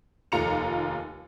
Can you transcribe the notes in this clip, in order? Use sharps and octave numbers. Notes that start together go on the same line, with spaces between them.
F1 D#2 F4 A#5 C#7 F7